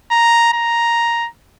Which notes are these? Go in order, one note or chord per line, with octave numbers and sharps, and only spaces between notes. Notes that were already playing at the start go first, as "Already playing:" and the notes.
A#5
A#5